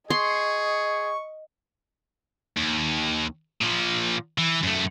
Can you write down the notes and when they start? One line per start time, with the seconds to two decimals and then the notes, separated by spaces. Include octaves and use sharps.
0.10 G#4 D#5 C6 C#6
2.57 D#2
3.61 A#2 F3
4.38 E3
4.63 F#2 A3